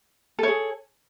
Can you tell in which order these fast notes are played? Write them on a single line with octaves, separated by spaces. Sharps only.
A4 C#5 G#4